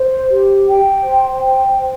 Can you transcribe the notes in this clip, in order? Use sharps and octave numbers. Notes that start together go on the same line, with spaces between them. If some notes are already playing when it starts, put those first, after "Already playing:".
Already playing: C5
G4
G5
C5
G5
C5